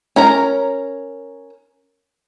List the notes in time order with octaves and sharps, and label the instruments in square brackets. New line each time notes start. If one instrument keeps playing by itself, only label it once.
[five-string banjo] C#4 A#4 A#5